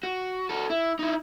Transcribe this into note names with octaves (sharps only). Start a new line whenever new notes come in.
F#4
F#4 A4
E4
D#4 E4